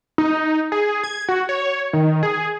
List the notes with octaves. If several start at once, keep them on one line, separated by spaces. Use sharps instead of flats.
D#4
G#4
G#6
F#4
C#5
D#3
G#4